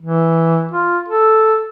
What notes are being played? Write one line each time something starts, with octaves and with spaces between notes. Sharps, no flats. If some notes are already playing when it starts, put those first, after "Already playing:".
E3
F4
A4